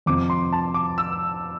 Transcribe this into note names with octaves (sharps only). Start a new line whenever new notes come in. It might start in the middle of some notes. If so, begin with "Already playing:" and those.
F2 C3 F3 C4 D6
C6
A5
D6
E6